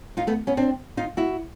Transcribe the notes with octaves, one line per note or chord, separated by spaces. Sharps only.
D#4 F4
A3 B3
B3 C#4
C4 D4
D#4 F4
E4 F#4